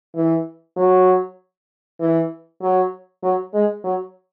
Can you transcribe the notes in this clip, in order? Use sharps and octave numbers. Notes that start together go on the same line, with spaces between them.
E3
F#3
E3
F#3
F#3
G#3
F#3